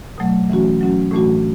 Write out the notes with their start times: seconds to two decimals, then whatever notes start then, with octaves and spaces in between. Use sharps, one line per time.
0.18 B2 F#3 A3
0.50 E3 A3 C#4 F#4
0.81 F#3 C#4 F#4
1.11 A2 E3 A3 D4 F#4